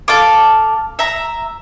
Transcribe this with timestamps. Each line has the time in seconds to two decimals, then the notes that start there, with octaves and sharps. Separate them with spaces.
0.08 A4 F5 D6
0.99 E5 A#5